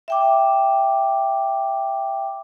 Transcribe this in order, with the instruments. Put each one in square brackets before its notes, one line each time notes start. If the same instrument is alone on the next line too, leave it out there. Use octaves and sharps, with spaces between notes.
[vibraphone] E5 G5 D6